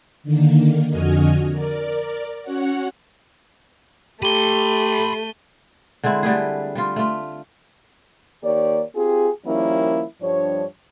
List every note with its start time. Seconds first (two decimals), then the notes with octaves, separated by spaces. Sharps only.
0.23 D3 D#3 A#3
0.89 F2 D3 F#4 D#5 G#5 F6
1.52 A#4 D5
2.43 C#4 F#4 C#5 F#5
4.23 A3 G4 B5 C6 D#7 G7
6.04 D3 G#3 C4 E4
6.23 D3 G3 A3 G#4
6.75 G3 F4
6.96 A3 F4
8.44 D#3 A#3 G4 C#5 D5
8.95 C4 F4 G4 G#4
9.46 D#3 F3 G3 A#3 C#4 E4
10.22 G2 F3 G3 D4 C#5